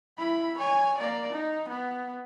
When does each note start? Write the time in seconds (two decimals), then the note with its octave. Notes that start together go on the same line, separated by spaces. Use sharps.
0.18 E4 B5
0.58 C#5 G#5
0.98 A#3 D5
1.32 D#4
1.69 B3